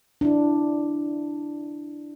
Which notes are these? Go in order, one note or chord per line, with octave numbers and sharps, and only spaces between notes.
D4 E4